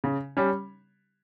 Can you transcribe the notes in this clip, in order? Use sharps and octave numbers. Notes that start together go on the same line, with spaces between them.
C#3
G3 C#4